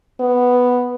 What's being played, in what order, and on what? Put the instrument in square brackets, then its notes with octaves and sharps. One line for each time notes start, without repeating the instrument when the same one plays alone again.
[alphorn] B3